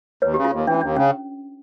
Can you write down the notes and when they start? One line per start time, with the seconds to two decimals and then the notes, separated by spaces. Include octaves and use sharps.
0.22 D#2 B4 C#5
0.34 G4
0.37 C#3
0.44 F4
0.52 D#2
0.67 E3 D4
0.74 C#4
0.81 D#2 D4
0.96 C#3 C#4